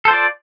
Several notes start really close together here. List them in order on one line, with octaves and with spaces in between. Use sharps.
A4 C5 F4 D5